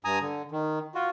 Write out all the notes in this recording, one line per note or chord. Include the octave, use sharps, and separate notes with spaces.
G2 G#5 A#5 D#6
D3
D#3
F4 F#4